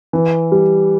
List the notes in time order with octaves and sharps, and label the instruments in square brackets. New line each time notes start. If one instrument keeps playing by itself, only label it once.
[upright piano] E3
G3